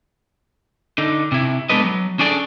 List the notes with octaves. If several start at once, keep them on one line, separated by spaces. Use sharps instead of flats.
D3 D#4
C3 E4
G#3 B3 D4 A4 B4 D#5
F#3
C#4 D4 G#4 A4 D5